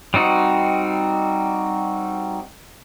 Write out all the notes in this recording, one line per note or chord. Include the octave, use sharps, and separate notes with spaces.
G3 C4 D#4 F#4